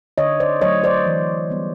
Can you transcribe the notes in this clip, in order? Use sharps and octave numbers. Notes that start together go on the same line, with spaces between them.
D3 C#5 D#5
C5 D5
F#3 A3 C#5 D#5
C5 D5
E3
G3 B3